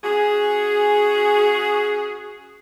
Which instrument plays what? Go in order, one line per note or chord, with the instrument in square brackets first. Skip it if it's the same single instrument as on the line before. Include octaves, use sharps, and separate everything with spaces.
[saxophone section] C#4 F#4 G#4